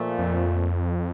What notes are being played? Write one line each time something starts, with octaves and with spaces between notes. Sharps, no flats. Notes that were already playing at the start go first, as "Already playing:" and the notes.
Already playing: A#2 F3 A3
F2